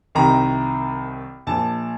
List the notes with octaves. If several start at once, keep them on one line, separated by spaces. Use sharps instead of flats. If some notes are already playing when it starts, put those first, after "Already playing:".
C2 C3 D#3 A#5
A#1 A#2 A5